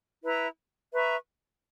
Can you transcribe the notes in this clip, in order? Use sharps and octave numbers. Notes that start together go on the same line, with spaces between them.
E4 B4 E5 A#5
B4 E5 A#5 C#6